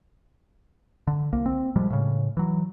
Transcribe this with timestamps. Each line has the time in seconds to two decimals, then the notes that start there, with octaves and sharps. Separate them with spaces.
1.07 D3
1.33 C2 A#3
1.46 C4
1.76 A#2 F3 G3 G#3
1.90 A2 C#3
2.37 E3 F#3